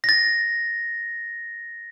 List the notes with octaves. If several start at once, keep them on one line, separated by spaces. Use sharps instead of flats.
A#6
A6